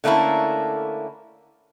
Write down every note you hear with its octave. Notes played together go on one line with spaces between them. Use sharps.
D3 A3 A#3 C#4 E4